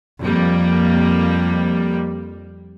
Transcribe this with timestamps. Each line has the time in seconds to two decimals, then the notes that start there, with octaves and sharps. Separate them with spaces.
0.21 F2 G3 A#3